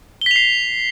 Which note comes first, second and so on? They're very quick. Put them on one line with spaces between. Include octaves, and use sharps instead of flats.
G7 B6 F7 C7